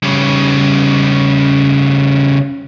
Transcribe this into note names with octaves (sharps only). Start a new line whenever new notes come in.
C#3 G3